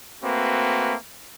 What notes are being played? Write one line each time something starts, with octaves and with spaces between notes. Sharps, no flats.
A3 A#3 C4 F#4 B4